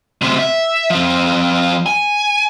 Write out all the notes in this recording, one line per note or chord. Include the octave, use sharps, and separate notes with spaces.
D2 C3
E5
F3 C4
G#5